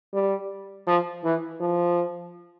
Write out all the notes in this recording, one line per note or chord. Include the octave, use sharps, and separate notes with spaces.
G3
F3
E3
F3